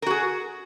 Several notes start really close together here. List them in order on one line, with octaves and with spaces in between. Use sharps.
A#4 F#4 G#4